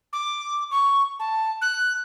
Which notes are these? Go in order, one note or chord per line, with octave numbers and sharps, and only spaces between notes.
D6
C#6
A5
F#6